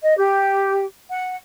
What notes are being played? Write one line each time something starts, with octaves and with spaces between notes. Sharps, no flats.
D#5
G4
F#5